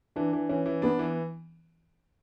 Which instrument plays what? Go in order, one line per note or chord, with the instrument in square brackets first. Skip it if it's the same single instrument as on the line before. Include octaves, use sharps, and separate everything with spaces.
[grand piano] E3 [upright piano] D4
[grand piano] E3
[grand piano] E3 [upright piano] C#4
[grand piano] E3
[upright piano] B3 [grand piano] D4
[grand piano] E3